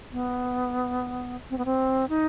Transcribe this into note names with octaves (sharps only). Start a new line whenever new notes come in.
B3
C4
B3
C4
D#4